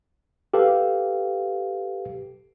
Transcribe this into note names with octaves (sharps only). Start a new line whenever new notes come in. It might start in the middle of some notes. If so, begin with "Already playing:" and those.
G4 A4 B4 F5